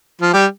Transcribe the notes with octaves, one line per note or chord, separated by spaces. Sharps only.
F3 F4
G3 G4